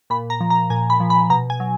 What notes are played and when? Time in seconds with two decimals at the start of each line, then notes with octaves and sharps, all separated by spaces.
0.10 A#2 B5
0.30 A#5
0.40 F3
0.50 A#5
0.70 A#2 G#5
0.90 B5
1.00 F3
1.10 B5
1.30 B2 A#5
1.50 G#5
1.60 F#3